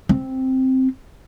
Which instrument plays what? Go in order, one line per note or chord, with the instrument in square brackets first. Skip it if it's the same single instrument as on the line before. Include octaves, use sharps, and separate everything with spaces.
[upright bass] C4